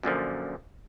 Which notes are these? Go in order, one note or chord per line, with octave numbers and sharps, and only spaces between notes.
F#2 A#2 D3 F3